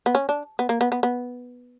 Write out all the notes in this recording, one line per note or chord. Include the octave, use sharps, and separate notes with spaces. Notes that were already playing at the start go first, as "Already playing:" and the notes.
B3
C#4
D4
B3
A#3
B3
B3
B3